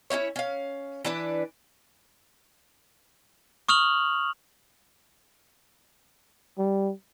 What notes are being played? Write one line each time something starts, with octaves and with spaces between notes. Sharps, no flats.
C#4 D#4 E4 C#5
C#4 F5
E3 D4 B4
C#6 D#6 F6 F7 F#7
G3